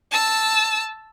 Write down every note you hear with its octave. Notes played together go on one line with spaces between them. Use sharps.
A5 E6